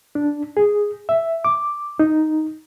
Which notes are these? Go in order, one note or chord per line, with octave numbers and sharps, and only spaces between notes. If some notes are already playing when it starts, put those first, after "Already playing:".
D4
G#4
E5
D6
D#4